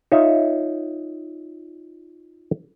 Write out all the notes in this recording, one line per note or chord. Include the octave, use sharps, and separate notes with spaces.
D#4 F4 C#5 E5